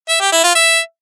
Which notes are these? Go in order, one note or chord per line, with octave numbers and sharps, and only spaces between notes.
E5
G4
E4
F4
E5